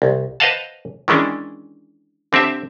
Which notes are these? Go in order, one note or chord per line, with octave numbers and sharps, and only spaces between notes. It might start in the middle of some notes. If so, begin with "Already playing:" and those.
C2
B4 C5 D#5 F5 F#5 A5
D#3 E3 G#3 C#4 D4
D3 C4 G4 E5